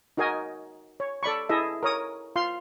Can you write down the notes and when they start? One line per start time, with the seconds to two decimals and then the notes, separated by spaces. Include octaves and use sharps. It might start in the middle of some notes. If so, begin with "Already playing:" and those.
0.17 D#4 F#4 A#4 D#5 G#5
1.00 C#5
1.23 A4 D5 B5 C#6
1.49 E4 G#4 A4 D#5 E5
1.83 A#4 C#5 D#6
2.36 F4 F5 C6